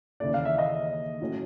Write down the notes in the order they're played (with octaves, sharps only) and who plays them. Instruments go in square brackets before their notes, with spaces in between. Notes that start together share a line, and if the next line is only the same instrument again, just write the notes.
[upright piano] D#2 C#3 E3 A3 [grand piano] D5
[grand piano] F5
E5
D#5
[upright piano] A2 F#3 A3 C#4